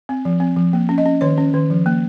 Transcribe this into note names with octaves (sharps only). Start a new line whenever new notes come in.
C4
F3
C4
F3
A#3
C#4
D#5
C#4
D#3 C#5
C#4
D#3
F3
A#3